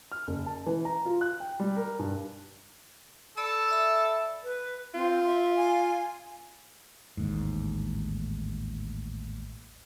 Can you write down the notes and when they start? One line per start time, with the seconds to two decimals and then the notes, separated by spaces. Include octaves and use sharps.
0.12 F6
0.27 F#1
0.46 A5
0.66 E3
0.85 A#5
1.05 F4
1.21 F#6
1.40 G5
1.60 G3
1.77 A#4
1.99 G2
3.37 A4 D5 B5 E6
3.69 D5 E5 B5
4.43 B4
4.94 C4 F4
5.25 E5
5.56 G#5
7.17 A1 D#2 G#2